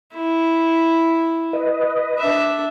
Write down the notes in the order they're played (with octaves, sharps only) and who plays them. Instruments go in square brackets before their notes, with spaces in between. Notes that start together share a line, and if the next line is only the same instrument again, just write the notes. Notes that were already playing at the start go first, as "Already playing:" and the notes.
[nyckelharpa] E4
[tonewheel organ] B4 D#5
[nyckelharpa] D4 E5